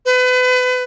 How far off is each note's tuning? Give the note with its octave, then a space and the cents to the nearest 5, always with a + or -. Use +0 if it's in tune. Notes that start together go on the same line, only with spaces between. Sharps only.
B4 +30